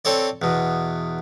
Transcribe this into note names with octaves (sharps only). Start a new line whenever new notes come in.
C4 A4 C#5 D5
E2 B2